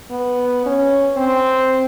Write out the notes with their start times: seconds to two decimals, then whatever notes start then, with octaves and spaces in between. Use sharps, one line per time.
0.11 B3
0.66 C#4
1.17 C4